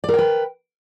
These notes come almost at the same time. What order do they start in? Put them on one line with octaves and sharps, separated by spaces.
D5 A#4 G5 B4